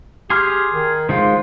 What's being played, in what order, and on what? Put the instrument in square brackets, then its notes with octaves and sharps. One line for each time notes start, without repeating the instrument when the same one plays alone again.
[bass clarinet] G4 [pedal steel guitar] G#4 C6 F6
[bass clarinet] D#3
[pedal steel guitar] D#3 G#3 F4 [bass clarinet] C5